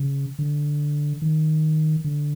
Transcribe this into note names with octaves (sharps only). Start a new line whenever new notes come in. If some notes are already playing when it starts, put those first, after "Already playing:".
Already playing: C#3
D3
D#3
D3